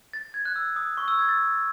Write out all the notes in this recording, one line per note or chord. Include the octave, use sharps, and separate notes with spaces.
A6
G#6
F#6
E6
D#6
C#6
E6
G#6
A6